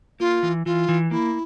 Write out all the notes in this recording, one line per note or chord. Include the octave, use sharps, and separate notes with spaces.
A#3 F4
E3
E3 F4
E3
A#3 E4